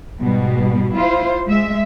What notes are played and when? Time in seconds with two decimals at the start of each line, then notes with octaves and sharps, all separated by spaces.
0.19 G#2 B2 G3
0.95 E4 F4 C5
1.46 G#3 E5